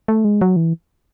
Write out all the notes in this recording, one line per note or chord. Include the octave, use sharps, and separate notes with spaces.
A3
G#3
F#3
E3